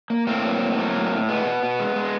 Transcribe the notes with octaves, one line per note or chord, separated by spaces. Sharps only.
A#3
A2 A#3 C4
F#3
A2
F#3
A2
A2
G#3 B3
B2
B2
G#3
G#3